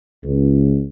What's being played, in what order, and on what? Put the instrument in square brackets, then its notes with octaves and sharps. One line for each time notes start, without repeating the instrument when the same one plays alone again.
[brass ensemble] C#2